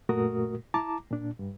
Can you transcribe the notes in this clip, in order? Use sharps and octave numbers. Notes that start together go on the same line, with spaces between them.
F#2 A#2 A3 F#4 A#4 D#6
E4 A5 A#5 D6
A#2 D4
G2